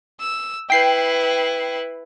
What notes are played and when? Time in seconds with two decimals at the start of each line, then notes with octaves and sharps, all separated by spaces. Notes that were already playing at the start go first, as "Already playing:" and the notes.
0.20 E6
0.70 E4 B4 G5 C7